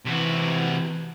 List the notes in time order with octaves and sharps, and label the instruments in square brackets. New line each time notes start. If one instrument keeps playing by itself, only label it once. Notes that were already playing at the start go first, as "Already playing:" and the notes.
[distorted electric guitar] C3 F#4 [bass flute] E3